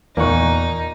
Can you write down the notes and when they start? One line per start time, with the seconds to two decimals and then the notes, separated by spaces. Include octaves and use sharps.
0.17 E2 A#2 A#3 D#4 F#5 C#6